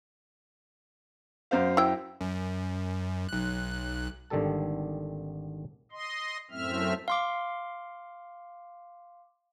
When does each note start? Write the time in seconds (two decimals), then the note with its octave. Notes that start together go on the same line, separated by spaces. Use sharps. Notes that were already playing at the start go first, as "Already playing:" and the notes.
1.51 F#2 C5 F5
1.77 E4 G5
2.21 F#2
3.29 B1 F#6
4.30 G#1 D3 D#3 G3 A4 A5
5.92 D#5 C6
6.51 F#2 A2 A3 C4 E5 F6
7.08 F5 C6 D6